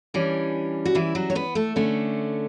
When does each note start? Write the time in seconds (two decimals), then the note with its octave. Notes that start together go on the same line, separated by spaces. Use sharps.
0.14 E3 G3 C#4 D4
0.85 F#4
0.95 E3 E4
1.15 F#3 F#4
1.30 C#5
1.35 B3 B4
1.55 A3 A4
1.76 D3 A3 C#4